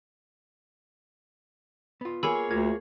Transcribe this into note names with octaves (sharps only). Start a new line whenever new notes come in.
B3 F4
A#3 G#4 C#5 G#5 B5 E6
D2 F4 A#4 E5 G#6